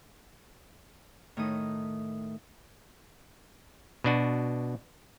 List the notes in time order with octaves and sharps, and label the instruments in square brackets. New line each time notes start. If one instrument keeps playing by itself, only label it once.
[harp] A2 D#3 A3 D#6
[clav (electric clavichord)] B2 D4 F#4